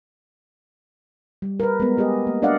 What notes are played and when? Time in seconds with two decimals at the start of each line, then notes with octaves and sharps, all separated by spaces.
1.42 G3
1.60 A#4 B4
1.80 G#3 B3
1.97 B3 G4 G#4 D#5
2.27 A#3
2.42 D4 D5 D#5 F5 F#5